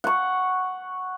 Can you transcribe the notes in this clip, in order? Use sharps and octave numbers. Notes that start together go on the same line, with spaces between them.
F#5 C#6